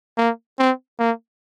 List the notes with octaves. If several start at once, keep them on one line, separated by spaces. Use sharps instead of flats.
A#3
C4
A#3